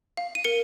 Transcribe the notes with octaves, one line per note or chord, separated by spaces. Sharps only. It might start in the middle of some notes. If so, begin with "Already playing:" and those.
F5
D#7
A#4 C#7